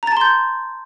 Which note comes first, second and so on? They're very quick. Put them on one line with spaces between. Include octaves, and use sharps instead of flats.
A#5 A6 A5 C6 G6